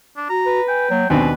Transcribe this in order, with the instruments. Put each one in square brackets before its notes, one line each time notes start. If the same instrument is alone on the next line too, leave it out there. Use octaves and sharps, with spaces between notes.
[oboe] D4
[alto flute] F#4 [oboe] A#5
[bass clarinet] B4
[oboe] G5 [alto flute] G#5
[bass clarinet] F#3 [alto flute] A#3
[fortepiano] D#2 B2 D4 [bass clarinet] C4 [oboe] B4 [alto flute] G#5